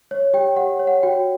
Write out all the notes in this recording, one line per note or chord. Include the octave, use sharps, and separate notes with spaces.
C#5
G4 G5
G4 F#5
C#5
F#5
F#4 G5